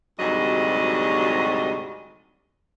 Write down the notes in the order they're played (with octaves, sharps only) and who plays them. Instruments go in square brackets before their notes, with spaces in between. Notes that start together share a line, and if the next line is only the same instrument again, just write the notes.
[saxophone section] D2 G#2 C3 F#3 G3 D#5